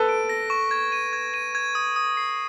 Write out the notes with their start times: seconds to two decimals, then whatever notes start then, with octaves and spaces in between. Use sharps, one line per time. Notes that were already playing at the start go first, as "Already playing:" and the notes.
Already playing: A4 B4
0.09 D7
0.29 A#6
0.50 C#6
0.71 G#6
0.92 D#7
1.13 G#6
1.34 D#7
1.55 G#6
1.75 D#6
1.96 D#6
2.17 C7